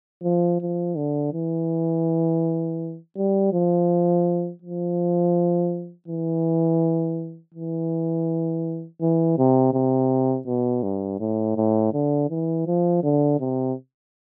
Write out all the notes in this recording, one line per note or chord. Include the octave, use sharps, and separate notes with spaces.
F3
F3
D3
E3
G3
F3
F3
E3
E3
E3
C3
C3
B2
G2
A2
A2
D3
E3
F3
D3
C3